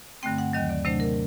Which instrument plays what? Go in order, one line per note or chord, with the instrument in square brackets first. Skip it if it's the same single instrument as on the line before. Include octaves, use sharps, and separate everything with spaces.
[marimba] G2 D3 A3 C4 G5
F#5
D#2 D#3 F#3 D#5
D5
C3 F#3 A3 D4 C5
A#4